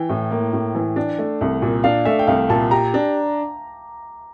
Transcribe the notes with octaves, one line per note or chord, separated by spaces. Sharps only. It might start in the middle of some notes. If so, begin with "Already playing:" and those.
Already playing: E3 G5
A2
A#3
A2
E3
D4
A3
C2
A#2
D4 F5
A3 E5
G5
C2 F5
A#2 A5
G4 A#5
D4